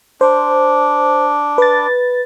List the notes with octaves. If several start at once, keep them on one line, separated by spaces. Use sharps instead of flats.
D4 C5
B4 A6